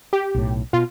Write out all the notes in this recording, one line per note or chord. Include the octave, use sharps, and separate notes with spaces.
G4
B1 A2
B2 F4